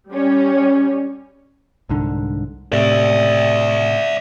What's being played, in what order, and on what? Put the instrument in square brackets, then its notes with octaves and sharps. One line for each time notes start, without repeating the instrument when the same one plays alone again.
[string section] G3 C#4
[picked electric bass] C2 G#2 D3
[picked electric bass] A2 C3 [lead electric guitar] D5 E5